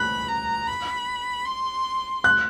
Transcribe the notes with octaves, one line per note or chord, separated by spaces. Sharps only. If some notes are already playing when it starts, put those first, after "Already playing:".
Already playing: B5 F#6
A#5
B5
C6
F#6